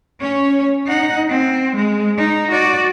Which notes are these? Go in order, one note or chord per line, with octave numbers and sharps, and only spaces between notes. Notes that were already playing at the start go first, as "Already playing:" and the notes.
C#4 C#5
D#4 F#5
C4
G#3
D#4
F#4 D5